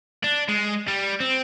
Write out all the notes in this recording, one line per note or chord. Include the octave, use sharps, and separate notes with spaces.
D4
G#3
G3
C4